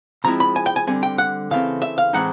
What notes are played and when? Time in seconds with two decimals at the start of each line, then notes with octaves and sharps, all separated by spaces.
0.24 C3 F3 G#3 C4 E4 A#5
0.40 B5
0.56 G#5
0.66 G5
0.76 G#5
0.87 D3 G3 C4 G#5
1.03 G5
1.18 F#5
1.51 C#3 E3 A3 C4 F5
1.82 E5
1.98 F5
2.13 A2 E3 G#3 C4 D#4 F#5